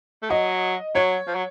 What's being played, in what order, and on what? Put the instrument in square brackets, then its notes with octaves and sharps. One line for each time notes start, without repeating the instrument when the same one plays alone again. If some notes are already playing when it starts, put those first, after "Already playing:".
[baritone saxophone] A3
[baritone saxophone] F#3 [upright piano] D#5
[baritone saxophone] F#3 [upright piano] C#5
[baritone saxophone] F3
F#3